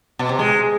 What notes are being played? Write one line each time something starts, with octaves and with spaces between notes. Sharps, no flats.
B2
C3
G#3